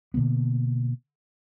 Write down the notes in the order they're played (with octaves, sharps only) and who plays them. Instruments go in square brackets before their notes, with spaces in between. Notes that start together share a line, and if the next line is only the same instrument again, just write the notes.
[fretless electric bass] B2 D3 A#3 B3